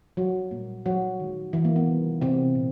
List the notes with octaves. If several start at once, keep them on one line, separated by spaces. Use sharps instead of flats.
F#3 F#4
A#2 G3 A#3
F#3 F#4
D#3 G#3
E3 E4
A#3
B3
C3 D#3 G3
C3 C4
A#2